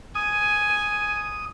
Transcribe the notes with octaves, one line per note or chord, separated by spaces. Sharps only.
G#5 D#6